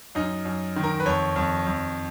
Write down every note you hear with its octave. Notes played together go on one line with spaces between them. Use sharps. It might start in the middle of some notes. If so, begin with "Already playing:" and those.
F#2 D#4
F#2
D#3
A#4
B4
F2 C#5
F2
F2